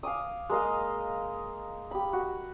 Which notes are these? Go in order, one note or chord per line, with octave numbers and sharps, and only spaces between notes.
F5 G#5 D6 D#6
G#3 A#3 D#5 F5
G4 B5
F#4